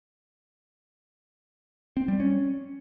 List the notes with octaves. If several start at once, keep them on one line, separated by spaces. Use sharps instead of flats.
C4
G3
C#4